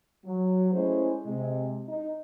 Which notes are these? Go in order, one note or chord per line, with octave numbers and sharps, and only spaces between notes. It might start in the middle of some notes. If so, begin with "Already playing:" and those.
F#3
G#3 A3 C#4 E4 G#4 C5
C3 G#3
D#4